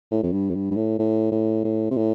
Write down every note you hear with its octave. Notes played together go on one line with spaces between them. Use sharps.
A2
F2
G2
F2
G2
G2
A2
A2
A2
A2
C3
A2